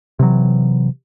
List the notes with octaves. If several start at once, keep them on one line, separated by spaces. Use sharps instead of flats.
C3 E3 F#3